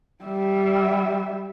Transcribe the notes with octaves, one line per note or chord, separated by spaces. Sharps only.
G3 E5